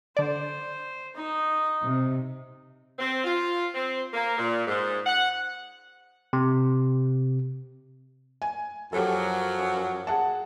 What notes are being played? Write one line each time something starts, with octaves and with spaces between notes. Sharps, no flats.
D3 C5 D5
D#4 D#5
C3
C4
F4
C4
A#3
A#2
G#2
F#5
C3
G#5
F#2 F3 F#3 G4 A4
G#4 F#5 A5